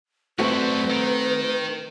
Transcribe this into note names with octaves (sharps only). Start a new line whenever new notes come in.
F#2 G3 A3 C4 F#4 B4
D#3